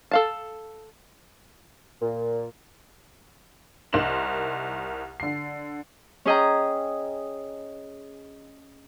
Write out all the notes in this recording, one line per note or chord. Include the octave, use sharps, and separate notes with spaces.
A4 F5 A5
A#2
C2 D#4 A#4 C6 E7 F#7
D3 C7
C#4 G#4 D#5 G5 A#5